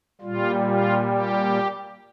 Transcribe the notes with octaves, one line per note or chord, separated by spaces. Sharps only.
A#2 G3 F4
F4
G4